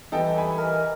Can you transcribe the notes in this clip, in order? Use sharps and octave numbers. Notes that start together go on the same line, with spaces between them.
E3 G3 D#4 G4 A4 G5 D#6
G#5 B5
A#4 D#5